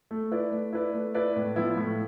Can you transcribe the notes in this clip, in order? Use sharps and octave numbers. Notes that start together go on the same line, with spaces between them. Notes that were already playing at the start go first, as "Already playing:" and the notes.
A3
E4 B4 D5
A3
E4 B4 D5
A3
E4 B4 D5
A2
F3 B3 E4
A2